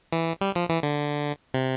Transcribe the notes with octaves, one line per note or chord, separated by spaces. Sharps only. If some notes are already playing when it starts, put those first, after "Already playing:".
E3
G3
F3
E3
D3
C3